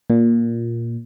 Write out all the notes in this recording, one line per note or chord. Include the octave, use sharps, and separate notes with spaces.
A#2